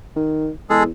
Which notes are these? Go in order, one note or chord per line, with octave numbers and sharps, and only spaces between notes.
D#3
E2 G#3 G#4 A4